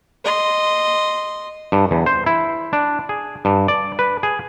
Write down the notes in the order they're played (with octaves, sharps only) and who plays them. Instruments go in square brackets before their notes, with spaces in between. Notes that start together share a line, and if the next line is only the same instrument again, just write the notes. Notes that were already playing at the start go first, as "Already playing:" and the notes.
[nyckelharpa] D#5 C6
[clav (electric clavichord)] G2
E2
C5
E4
D4
G#4
G2
D5
B4
G#4